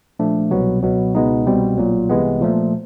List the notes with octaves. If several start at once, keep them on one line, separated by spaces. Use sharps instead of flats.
A#2 F3 A3 D4
C2 B2 F#3 B3
C#2 B2 F#3 B3
C#2 B2 G#3 B3 D#4
C2 B2 G3 C4
B1 A#2 F#3
C2 C3 E3 G#3 B3
A#2 F3 A3